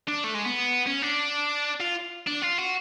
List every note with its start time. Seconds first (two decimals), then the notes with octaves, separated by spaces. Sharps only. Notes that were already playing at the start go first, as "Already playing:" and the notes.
0.08 D4
0.24 A3
0.34 G#3
0.45 B3
0.86 C#4
1.02 D4
1.80 F4
2.27 D4
2.42 F4
2.59 F#4